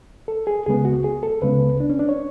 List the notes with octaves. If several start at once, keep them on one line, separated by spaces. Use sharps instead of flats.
A4
G#4
C#2 C#3 G#3 B3 G#4
F#4
G#4
A4
C#2 C#3 G#3 B3 B4
D4
C#4
D4
C#5